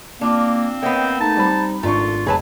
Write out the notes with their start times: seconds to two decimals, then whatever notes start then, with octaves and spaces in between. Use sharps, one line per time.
0.21 A#3 C4 D4 F4
0.83 A#3 B3 C#5 D#5 G5
1.20 A3 D#4 A5
1.37 G3 C4 B5
1.83 G#1 A3 D4 F4 C#6
2.26 F1 F#3 G#4 B4 A5